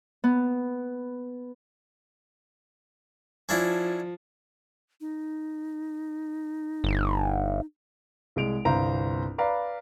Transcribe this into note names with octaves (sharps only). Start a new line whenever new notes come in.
B3
F3 C#4 D4 E4
D#4
G1
C2 G#3 D7 F7
G1 C2 C4 C5 F5 A#5
B4 D5 F5 A#5 B5